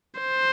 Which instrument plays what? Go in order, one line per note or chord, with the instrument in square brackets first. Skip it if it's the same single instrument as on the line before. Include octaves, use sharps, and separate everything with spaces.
[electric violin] C5